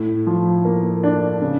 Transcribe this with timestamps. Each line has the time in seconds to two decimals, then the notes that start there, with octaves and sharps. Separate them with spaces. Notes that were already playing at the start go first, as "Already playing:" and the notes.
Already playing: A2
0.27 F3
0.65 A#3
1.03 D4
1.42 C#3